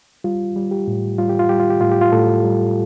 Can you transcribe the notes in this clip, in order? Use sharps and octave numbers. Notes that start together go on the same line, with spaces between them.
G3 F4
G3
G4
A2
G3 F4
G4
F4
G3 G4
F4
G4
A2 F4
G4
F4
A2 A4
G3